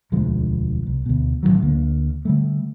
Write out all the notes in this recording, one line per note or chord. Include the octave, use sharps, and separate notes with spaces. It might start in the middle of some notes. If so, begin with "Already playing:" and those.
E1 D2 F3 G#3
C2
D2 B2
A1 B2 D#3 F#3
D2 D3 A#3
D3 G3 A3